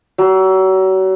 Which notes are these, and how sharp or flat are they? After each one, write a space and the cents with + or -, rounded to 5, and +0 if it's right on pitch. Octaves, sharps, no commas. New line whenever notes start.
F#3 +35